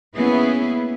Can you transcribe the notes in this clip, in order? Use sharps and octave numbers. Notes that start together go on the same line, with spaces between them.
A#3 B3 C#4 E4 G#4 B4